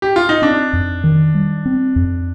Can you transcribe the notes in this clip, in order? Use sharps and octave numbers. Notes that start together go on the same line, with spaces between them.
G4
F4
D#4
C4 D4
F2
D#3
G3
C4
F2